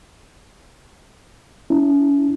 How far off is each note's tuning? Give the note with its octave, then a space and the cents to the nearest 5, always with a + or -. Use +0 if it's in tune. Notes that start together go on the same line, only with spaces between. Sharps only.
C#4 +35 E4 +0